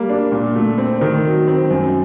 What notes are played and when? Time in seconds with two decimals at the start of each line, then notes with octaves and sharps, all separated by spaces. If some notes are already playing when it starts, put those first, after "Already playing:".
Already playing: G3 A#3
0.10 D4
0.32 A#2
0.56 A3
0.78 C4
1.01 D#3
1.25 F#3
1.47 C4
1.71 F#2